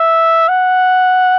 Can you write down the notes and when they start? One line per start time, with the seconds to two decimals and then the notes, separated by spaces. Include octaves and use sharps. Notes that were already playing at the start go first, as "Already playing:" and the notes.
Already playing: E5
0.49 F#5